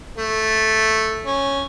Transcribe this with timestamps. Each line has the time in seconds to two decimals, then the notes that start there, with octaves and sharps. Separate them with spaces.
0.17 A3
1.26 C#4